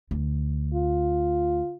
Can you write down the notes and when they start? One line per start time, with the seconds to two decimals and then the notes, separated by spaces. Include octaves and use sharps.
0.11 D2
0.74 F4